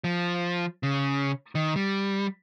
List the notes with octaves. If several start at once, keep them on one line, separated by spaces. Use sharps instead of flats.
F3
C#3
D#3
G3